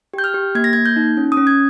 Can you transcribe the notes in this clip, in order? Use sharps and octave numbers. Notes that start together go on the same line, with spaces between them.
G4 G6
F6
G4
A#3 G#6
A#6
A#3 G#6
G6
D#4
C#4
D#6
C#4
G#6